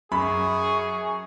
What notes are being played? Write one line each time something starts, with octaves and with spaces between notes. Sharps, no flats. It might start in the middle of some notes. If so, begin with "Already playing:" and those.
F#2 G#4 B5 C#6